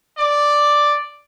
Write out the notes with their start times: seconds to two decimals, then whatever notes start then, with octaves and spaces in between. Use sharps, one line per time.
0.18 D5